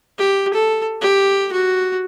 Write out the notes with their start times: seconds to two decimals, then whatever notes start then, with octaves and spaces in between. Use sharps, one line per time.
0.18 G4
0.54 A4
1.01 G4
1.52 F#4